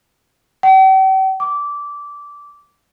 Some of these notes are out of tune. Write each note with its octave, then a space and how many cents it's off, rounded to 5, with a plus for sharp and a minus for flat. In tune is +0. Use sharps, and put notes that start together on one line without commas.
G5 -45
D6 -15